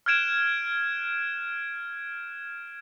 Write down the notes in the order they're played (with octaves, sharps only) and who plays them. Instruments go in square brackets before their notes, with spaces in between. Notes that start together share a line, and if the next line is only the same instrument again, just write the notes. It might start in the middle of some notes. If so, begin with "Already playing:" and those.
[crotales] F6 F#6 G#6 D7 E7